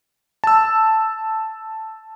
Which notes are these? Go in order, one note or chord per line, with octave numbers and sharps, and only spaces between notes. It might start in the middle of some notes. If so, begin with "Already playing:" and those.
A5 E6